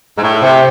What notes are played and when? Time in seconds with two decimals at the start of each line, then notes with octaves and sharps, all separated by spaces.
0.18 G#2
0.23 A2
0.42 C3